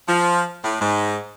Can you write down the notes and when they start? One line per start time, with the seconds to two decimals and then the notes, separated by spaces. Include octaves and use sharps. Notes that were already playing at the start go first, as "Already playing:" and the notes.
0.08 F3
0.63 A2
0.80 G#2